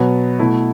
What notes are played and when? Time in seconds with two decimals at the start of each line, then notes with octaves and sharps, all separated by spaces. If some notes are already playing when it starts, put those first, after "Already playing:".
Already playing: B2 F#3 B3
0.39 B2 A3 E4